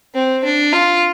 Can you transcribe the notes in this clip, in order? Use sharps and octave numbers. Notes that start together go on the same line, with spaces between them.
C4
D4
F4